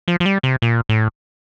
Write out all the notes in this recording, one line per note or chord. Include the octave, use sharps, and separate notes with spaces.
F3
F3
G3
C3
A#2
A2